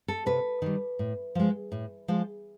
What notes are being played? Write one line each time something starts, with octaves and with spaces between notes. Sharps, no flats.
A4
C3 B4
D#3 G3
A2
F3 G#3
A2
F3 G#3